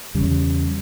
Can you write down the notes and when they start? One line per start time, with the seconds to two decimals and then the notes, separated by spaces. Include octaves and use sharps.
0.15 E2 C#3 G3